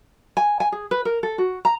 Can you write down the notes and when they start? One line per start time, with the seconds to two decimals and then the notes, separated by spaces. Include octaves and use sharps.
0.37 G#5
0.60 G#5
0.72 G#4
0.91 B4
1.05 A#4
1.23 A4
1.38 F#4
1.65 A#5